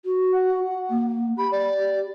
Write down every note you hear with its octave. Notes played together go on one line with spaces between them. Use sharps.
F#4
F#5
A#3
G4 B5
D5